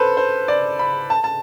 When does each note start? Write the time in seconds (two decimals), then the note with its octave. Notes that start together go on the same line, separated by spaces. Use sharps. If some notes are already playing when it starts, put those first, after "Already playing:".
Already playing: A4 B4 C5
0.17 C5
0.48 D5
0.79 B5
1.10 A5
1.24 A5